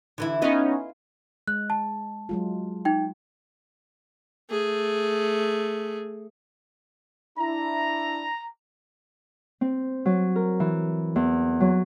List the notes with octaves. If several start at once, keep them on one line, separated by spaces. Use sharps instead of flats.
D3 E3 E4
B3 C#4 D#4 F4 B4 D#5
G#3 F#6
A5
F#3 G#3 F4
D#4 G5
A3 G#4
D4 E4 A#5
C4
F#3
A#4
E3
E2
F#3